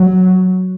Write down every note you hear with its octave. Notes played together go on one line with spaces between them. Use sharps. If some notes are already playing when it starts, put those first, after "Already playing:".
Already playing: F#3